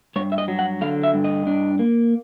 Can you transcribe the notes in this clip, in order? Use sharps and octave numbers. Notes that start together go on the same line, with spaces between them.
G2 C#5
E5
D#5
F#3
F#5
D3 F5
E5
G2
D#5
D4
A#3